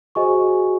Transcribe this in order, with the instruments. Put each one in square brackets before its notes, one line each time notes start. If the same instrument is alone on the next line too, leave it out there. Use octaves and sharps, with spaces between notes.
[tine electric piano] F#4 G#4 [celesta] C5 D#5 G#5 C#6